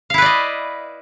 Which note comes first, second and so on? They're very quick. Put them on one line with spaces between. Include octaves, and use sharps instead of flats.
F5 E4 B4 D5 D#5